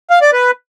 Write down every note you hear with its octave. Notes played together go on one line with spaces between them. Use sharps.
F5
D5
B4